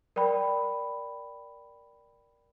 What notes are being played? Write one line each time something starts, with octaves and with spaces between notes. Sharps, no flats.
A#4 D5 G5 B5